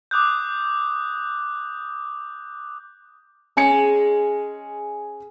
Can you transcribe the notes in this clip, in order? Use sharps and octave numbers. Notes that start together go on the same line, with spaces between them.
D6 D#6 F#6 G6
G#3 C#4 G#5 C#7